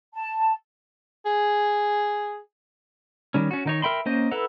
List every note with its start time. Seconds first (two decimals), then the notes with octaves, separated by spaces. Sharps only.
0.14 A5
1.25 G#4
3.34 D#3 G3 C#4
3.51 C#4 F#4
3.66 D#3 D#4 C#5
3.82 A#4 E5 G5 B5 C6
4.06 A#3 C#4 C5 D#5
4.31 E4 A4 B4 F#5 A#5